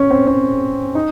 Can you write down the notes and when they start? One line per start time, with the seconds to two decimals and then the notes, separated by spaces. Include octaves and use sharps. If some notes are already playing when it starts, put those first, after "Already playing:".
Already playing: C#4
0.11 C4
0.27 C#4
0.95 D#4